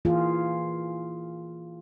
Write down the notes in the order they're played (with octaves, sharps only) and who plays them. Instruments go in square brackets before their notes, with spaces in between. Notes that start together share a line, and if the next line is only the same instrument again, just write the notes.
[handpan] E3 A#3 F4 G#4